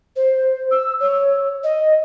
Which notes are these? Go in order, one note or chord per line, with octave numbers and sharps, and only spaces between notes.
C5
E6
C#5
D#5